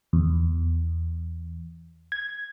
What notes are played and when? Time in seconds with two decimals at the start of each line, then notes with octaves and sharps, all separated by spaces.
0.13 E2
2.12 G#6